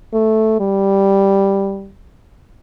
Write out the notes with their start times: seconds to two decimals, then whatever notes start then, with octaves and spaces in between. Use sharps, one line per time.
0.13 A3
0.60 G3